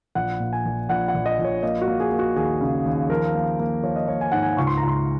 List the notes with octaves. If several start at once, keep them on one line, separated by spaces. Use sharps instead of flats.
A#1 F#5
A#2
G#5
A#1
A#1 F#5
F#5
A#1
D#5
A#1
C#5
A#3 D#5
F#4
A#3
G#4
A#3
F#4
D#2 G#4
C#3
D#2
F3 A#4
A#3
A#3
F3 C#5
D#5
A#3 C#5
G#5
G#2 F#5
G#5
C#2 C#6
C6
A#5
C#2
C6